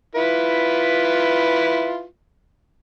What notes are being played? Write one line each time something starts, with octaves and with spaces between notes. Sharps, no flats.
E4 F4 B4